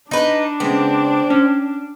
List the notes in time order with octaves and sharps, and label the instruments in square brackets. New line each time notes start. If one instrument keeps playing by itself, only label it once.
[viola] D4 [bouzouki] D#4 B4
[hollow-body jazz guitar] C#3 G#3 B3 [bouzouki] C4
[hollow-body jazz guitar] C#4